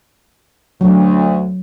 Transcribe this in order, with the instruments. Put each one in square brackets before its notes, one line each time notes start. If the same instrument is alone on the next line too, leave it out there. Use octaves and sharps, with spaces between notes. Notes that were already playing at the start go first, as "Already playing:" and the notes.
[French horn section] D2 [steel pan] F#3